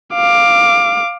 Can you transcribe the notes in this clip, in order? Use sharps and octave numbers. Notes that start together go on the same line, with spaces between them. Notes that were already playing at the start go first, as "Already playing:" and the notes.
F5 D6